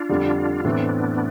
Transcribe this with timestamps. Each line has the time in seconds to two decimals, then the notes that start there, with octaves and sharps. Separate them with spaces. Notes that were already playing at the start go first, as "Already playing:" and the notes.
Already playing: D4 F4
0.09 F2 D3 G3
0.65 A2 E3 A3 B3 C4 D4